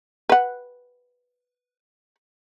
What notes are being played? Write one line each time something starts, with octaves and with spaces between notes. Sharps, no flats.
B4 F#5